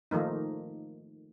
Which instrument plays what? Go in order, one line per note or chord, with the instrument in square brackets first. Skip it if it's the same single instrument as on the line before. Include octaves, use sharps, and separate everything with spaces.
[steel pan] D#3 F3 A3 A#3 D#4